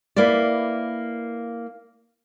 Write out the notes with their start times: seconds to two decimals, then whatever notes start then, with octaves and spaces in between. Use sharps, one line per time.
0.16 A#3 E4 B4 D5